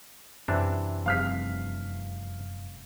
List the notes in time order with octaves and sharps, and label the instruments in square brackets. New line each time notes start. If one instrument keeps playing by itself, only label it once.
[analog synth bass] F#2 [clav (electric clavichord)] C3 E3 D4
[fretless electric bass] F1 G2 C4 [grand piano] F5 F6 B6